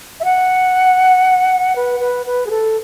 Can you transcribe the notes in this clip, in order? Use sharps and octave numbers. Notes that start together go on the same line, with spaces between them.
E5
F#5
B4
B4
B4
G#4
A4